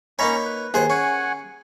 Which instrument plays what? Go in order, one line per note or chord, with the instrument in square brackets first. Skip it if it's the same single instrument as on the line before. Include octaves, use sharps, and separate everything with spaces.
[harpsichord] A#3 D#4 C#5 [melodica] C#4 A#5 C#6 [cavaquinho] B5
[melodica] B4
[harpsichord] D#2 C5 F#5 [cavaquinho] G#4
[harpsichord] C#4 [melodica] F#5 G#5 C#6